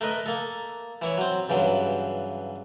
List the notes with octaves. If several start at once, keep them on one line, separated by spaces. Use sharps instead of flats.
A3 A#4 B4 D#5
A#3 A4
E3 E4 C#5
F#3 C4
G2 C#3 E3 F#3